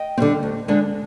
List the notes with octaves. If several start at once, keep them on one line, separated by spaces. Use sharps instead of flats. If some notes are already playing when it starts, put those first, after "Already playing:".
Already playing: D#5 G5
C4
D3 G3
D2
D3 G#3 D4